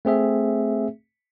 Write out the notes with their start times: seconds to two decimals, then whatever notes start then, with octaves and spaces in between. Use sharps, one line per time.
0.05 A3 C4 G#4 E5